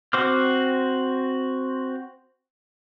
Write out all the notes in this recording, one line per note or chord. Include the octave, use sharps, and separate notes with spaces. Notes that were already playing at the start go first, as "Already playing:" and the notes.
C4 F#4 C5 D6 F6